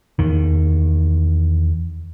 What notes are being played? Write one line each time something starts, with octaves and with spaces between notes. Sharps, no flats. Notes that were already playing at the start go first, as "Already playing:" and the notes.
E2 D#3